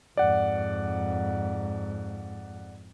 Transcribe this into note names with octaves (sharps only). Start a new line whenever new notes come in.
F2 G#2 D5 F#5